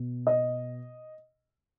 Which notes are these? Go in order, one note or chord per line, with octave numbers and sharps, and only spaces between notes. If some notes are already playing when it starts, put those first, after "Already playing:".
Already playing: B2
D#5